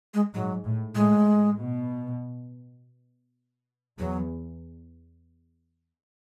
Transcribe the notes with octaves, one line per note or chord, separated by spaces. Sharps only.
G#3
G#2 F#3
A2
A2 G#3
B2
E2 F#3